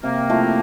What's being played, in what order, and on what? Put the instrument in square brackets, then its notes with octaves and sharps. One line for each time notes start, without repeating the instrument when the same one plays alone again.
[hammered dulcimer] C3 [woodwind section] A#3
[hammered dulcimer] F3 A3 E4